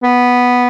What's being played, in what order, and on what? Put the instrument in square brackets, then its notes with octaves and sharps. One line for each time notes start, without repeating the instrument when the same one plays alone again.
[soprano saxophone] B3